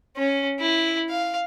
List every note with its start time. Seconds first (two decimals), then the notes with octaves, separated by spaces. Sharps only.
0.17 C#4
0.60 E4
1.10 F5